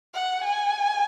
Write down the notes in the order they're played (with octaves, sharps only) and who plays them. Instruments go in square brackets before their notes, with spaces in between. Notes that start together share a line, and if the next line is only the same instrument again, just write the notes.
[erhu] F#5
G#5